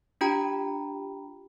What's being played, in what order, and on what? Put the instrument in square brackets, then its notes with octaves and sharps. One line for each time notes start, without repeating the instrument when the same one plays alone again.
[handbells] D4 F4 G4 G5 A#5 B5